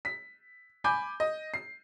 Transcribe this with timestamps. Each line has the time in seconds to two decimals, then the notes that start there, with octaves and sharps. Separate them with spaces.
0.05 B6
0.84 G#5 B5 D6 G6
1.20 D#5
1.54 C7